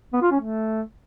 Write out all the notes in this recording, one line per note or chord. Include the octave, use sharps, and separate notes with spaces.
B3
F4
C#4
A3